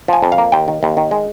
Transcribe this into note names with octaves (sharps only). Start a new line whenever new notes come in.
F3 G#5
F2
F5
A#3
D#2 G5
D#3
D#2
D#3
G#3